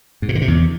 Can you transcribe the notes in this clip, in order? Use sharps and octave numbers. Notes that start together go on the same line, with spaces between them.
G#2
A#2
D3
C3
E2